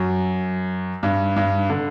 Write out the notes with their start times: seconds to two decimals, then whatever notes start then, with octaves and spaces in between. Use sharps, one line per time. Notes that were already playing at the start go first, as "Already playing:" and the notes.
Already playing: F#2
1.03 G2
1.36 G2
1.70 D3